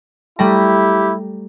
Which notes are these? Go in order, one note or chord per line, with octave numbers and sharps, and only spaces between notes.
G3 A3 E4 G4 A#5